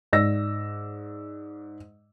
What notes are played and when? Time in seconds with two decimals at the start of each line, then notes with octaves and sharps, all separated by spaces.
0.13 G#2 D5 E6 A#6